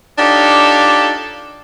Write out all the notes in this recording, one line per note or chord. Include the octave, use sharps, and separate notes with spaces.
D4 D#4 F4 G4 A4 C#5